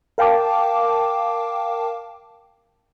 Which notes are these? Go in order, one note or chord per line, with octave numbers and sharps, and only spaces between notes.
A#4 F5 G5 A5 D6